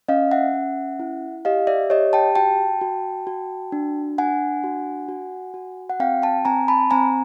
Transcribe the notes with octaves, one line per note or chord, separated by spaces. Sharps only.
C#4 D#5 F5
E5 F#5
C#4
E4
G4 D#5 F5
D5 E5
G4 C#5 D#5
G5 A5
F#4 G5 A5
F#4
F#4
D4
D4 F#5 G#5
F#4
F#4
F#4
F#5
C4 F5 G5
G5 A5
C4 G#5 A#5
A5 B5
C4 G#5 A#5